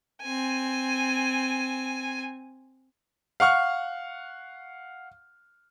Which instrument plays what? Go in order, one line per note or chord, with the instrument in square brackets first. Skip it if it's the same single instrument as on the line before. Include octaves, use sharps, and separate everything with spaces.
[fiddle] C4 G#5
[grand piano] F5 F#5 C#6 F6